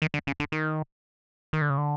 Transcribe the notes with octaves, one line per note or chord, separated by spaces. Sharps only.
D#3
D3
C#3
D3
D#3
D#3
D3
C#3
D3